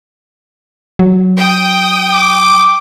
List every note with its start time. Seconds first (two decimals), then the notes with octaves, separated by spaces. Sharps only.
0.99 F#3
1.38 G5 D#6
2.13 D6